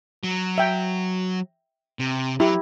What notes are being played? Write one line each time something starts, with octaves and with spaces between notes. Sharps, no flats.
F#3
E5 G5
C3
F#3 E4 G4